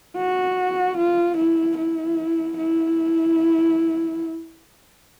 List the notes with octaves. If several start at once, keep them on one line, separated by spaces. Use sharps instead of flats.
F#4
F4
E4
E4
E4